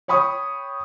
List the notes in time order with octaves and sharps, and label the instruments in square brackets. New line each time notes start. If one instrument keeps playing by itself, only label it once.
[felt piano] C#5 G5 B5 C#6 D#6